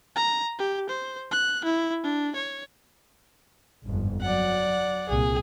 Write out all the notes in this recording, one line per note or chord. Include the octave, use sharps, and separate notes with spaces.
A#5
G4
C5
F#6
E4
D4
C#5
G1 F2 G#2
F#3 D5 F#5
C2 A#2 G#4